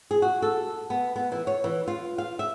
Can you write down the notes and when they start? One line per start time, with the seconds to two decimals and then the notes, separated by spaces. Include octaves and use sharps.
0.11 G#4
0.22 F#4
0.42 A4
0.90 B3
1.16 B3
1.32 E3
1.47 C#5
1.64 E3
1.87 F4
2.18 F5
2.39 E5